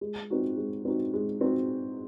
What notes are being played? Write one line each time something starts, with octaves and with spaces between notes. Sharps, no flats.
G#3
C4 D#4 F#4
G#3
C4 D#4 F#4
G#3
C4 D#4 F#4